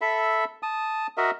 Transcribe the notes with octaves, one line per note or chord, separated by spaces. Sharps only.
A4 E5 B5
A5 D#6
F#4 A#4 D#5 E5